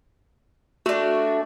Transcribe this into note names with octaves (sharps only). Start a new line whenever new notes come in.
A3 D4 F#4